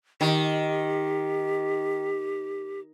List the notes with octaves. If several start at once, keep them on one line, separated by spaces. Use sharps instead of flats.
D#3 G4